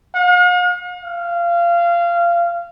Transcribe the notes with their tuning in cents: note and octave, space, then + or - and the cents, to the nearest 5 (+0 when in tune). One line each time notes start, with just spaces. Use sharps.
F5 +45
F5 -20